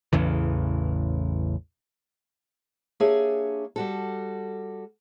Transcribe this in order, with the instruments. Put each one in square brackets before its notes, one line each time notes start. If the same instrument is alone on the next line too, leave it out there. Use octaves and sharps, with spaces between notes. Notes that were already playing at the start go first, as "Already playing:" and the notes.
[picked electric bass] A1 E2 C#3 E3
[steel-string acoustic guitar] A#3 D4 G4 G#4 C#5 E5
G3 F#4 A4